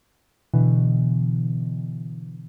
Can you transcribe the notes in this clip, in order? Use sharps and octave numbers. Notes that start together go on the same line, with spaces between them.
B2 D3 E3